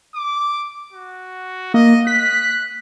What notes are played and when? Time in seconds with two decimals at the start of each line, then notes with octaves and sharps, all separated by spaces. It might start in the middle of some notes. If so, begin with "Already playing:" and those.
0.15 D6
0.93 F#4
1.74 A#3 D#5
2.07 F#6 B6